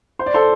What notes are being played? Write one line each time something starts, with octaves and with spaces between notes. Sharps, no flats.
C5
D5
A4 C5